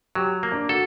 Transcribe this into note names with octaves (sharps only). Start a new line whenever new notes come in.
F#3 G4
A#3
D4
F#4 A4